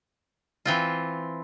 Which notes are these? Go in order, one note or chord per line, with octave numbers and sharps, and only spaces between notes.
E3 C4 F4